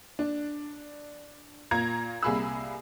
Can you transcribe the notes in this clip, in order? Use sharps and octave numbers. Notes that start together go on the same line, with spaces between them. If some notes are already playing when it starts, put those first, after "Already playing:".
D4
A#2 A#3 A#5 G#6
C2 A#3 G#4 B5 E6